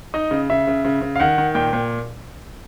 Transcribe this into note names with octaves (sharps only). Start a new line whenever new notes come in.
D#4 D#5
C#3
C#3 E5
C#3
C#3
C#3
F5
D#3 F#5
D#3
A#2 G5
A#2